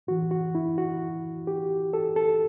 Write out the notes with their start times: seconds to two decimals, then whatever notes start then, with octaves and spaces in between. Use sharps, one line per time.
0.07 A2 E3 F#4
0.31 F#4
0.55 E4
0.78 F#4
1.47 G4
1.93 A4
2.16 A4